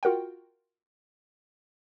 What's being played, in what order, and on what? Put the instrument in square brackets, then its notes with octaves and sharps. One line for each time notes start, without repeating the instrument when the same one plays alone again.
[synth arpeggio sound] F4 F#4 A#4 F#5 G5